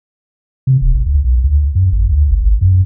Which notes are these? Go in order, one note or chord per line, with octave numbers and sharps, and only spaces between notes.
C3
D#1
G#1
D2
B1
D2
F#2
G#1
D2
G1
G#1
F#2